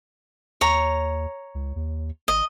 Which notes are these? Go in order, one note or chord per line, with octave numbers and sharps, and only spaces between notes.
D#2 C#5 A#5
C#2
D#2
G#1 D#5